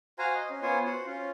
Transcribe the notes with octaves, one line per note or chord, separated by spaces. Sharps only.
F#4 C5 F5 G#5 A#5
D#5
C#4
B3 F4 C5 C#5 G#5
F#4 C5 F#5
C#4 F4